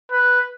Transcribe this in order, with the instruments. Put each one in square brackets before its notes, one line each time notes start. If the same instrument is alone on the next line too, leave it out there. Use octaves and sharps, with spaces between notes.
[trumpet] B4